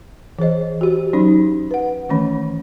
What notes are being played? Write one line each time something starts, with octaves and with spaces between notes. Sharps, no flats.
E3 G#4 C5 D#5
F#4 G4 C5
F#3 C#4 D#4 C5 B5
B4 F#5
D#3 E3 A3 C#4 B5